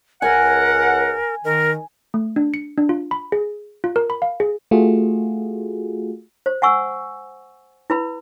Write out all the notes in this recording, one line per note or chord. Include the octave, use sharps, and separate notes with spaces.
C#2 A#4 F#5 G#5
D#3 A#4
A3
D4
C#7
D4
F4
B5
G#4
F4
A#4
B5
F5
G#4
A3 F4 F#4 G#4
C5
F#5 G#5 C#6 E6
E4 B4 B5